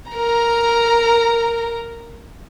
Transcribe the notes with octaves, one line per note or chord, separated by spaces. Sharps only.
A#4 A#5